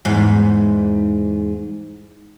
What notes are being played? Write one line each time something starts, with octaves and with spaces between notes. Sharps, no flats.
E2 G#2